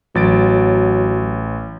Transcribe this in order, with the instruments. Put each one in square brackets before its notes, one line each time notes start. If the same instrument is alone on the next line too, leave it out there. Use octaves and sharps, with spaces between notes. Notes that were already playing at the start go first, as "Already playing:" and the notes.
[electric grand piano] A1 A6 D7 [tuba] F#3